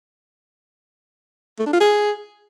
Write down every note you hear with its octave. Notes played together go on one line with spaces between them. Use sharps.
A3
D4
F4
G#4